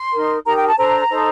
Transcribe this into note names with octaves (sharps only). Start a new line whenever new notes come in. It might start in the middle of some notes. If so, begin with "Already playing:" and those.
Already playing: C6
D#4 A#4
D#4 G4 A#4 A#5
G5
A5
D4 A4 C5 A#5
D#4 A4 C5